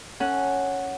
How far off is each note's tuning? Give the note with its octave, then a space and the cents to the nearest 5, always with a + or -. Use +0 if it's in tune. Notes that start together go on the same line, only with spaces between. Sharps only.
C#4 +0 A4 +25 F#5 +0